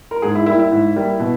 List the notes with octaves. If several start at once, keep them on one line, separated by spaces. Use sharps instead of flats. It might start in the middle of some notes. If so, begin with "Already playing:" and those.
A#4
G#2 G#4
E4
G3 A#3 E4
E4
G#2
G3 A#3
B2